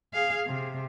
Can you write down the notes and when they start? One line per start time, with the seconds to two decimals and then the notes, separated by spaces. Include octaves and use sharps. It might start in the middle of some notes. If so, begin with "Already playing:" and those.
0.13 G#4 F5
0.47 C3